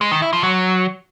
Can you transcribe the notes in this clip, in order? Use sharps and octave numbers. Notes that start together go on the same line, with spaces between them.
G#3
D#3
E4
F3
F#3